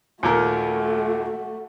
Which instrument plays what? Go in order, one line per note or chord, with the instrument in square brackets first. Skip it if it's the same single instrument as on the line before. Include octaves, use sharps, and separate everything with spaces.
[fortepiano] D#2 A#2 A#4 [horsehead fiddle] A3 F#4